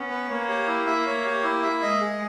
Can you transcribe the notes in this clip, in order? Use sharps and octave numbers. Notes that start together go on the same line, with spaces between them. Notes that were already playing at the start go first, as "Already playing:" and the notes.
Already playing: B3 C#4
B4
A#3 C#5
G4
E4
E5
C#5
G4
E4
E5
G#3 D#5
G#4